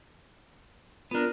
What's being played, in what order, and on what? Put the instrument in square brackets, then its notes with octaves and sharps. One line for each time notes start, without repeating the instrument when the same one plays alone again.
[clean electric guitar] B3 D4 [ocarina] F4 [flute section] A#4